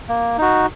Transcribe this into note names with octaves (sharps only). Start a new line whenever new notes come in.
A#3
D#4 F#4